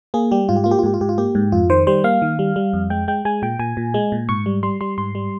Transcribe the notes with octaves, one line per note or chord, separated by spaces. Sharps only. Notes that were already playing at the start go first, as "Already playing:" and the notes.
A#3 G#4
G3 G4
G#2 F4
G4
A#3 F4
G4
F4
G#2 G4
F4
G#2 G4
F4
A#3 G4
G#2
F2 F4
D#3 C5
G3 C5
A#3 F5
D#3
G3
G3
F2
G#3 G5
G#3 G5
G#3 G#5
A#2 G5
A#2 G#5
A#2
G#3
A#2
G#2 C#6
G3
G3 C6
G3 C6
G#2 C6
G3